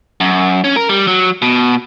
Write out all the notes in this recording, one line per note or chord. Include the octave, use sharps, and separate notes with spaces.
F#2
C#4
A#4
G3
F#3
B2